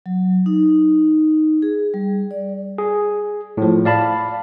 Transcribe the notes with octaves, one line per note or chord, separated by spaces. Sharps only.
F#3
D#4
G#4
G3
D5
G#4
A2 F3
D5 F5 A5 B5